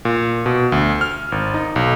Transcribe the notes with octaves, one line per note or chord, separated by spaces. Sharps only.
A#2
B2
D2
F6
G#1
D#4
B1